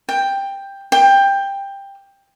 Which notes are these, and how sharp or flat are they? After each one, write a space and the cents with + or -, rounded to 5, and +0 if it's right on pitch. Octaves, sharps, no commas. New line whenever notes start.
G5 +10
G5 +15